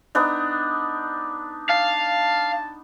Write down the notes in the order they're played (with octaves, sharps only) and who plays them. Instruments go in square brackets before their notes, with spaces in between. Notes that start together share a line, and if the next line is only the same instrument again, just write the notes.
[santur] B3 D4 D#4
[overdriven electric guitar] F5 [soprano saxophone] A5